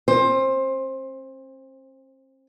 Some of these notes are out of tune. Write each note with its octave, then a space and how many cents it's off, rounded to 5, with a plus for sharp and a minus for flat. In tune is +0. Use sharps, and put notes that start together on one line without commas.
C4 +45 C5 +20